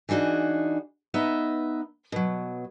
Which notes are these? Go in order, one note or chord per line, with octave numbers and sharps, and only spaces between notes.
E3 D4 D#4 F#4 G#4
B3 D#4 D#5 E5
B2 F#3